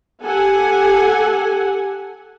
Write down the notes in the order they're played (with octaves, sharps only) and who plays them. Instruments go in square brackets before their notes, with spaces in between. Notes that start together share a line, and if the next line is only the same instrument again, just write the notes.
[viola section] G4 A4 F#5 G#5